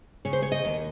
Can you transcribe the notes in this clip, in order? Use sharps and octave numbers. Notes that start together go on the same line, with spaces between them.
C#3 C#5
C5
C#5
D#5
D#2